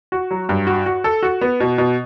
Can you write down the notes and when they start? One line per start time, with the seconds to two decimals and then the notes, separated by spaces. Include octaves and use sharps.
0.12 F#4
0.31 F#3
0.49 G2
0.67 F#4
0.86 F#4
1.04 A4
1.23 F#4
1.41 B3
1.60 B2
1.78 B2